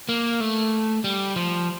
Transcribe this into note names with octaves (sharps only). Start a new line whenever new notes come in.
A#3
A3
G3
F3